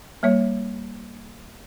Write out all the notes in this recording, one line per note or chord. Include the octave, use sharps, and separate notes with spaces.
G3 A#3 C#5 E5